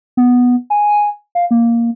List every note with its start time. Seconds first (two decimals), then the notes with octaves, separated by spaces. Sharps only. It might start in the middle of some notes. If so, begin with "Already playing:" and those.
0.17 B3
0.70 G#5
1.35 F5
1.51 A#3